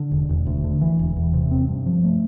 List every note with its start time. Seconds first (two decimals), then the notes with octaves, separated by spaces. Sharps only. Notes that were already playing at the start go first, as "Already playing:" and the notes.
Already playing: D3
0.11 E1
0.29 E1
0.47 D2
0.64 D3
0.81 E3
0.99 E1
1.16 E2
1.33 C3
1.51 C4
1.69 G2
1.86 F3
2.04 A3